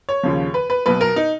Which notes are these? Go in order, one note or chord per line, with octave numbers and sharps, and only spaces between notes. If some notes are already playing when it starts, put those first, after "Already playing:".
C#5
D#2 C#3 F3
B4
B4
B1 B2 B4
A#4
D#4